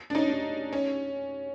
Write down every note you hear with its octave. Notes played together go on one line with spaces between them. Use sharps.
D4
C#4 D#4
D4
C#4